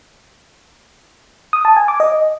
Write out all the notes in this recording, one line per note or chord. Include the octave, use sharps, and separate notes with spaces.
D#6
A5
G#5
D6
D#5